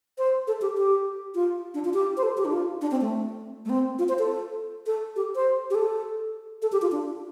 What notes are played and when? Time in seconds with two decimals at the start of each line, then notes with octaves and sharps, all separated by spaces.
0.18 C5
0.47 A4
0.61 G4
0.77 G4
1.35 F4
1.74 D4
1.84 F4
1.94 G4
2.17 C5
2.23 A4
2.37 G4
2.45 D4
2.52 F4
2.81 D4
2.91 C4
3.01 A3
3.65 A3
3.69 C4
3.99 F4
4.09 C5
4.19 A4
4.86 A4
5.16 G4
5.35 C5
5.70 G4
5.75 A4
6.62 A4
6.72 G4
6.82 F4
6.92 D4